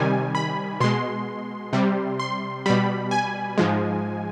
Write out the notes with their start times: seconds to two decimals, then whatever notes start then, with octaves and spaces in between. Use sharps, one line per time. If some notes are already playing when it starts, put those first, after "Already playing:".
Already playing: C3 D#3 G3 G#5
0.35 B5
0.80 B2 G#3 C6
1.73 C3 G3
2.19 C6
2.66 B2 G3 B5
3.11 G#5
3.58 G#2 F3 G#3